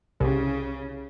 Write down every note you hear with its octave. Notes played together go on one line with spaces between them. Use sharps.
C2 C#3